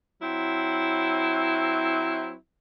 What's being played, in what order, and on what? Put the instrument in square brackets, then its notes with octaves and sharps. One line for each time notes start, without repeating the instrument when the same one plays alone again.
[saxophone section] F#3 C4 E4